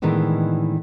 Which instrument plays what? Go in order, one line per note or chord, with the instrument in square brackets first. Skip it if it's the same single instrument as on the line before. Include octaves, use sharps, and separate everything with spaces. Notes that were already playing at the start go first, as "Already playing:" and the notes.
[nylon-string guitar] A2 D#3 E3 G#3 B3 D4